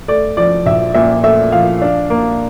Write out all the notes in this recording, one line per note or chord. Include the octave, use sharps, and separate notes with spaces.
A3 D5
F3 D5
A#1 E5
A#2 E5
A3 E5
F3 F5
D4
A#3